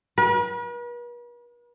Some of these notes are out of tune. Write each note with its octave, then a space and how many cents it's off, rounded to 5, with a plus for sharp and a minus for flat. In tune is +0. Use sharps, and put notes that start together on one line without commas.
B4 -45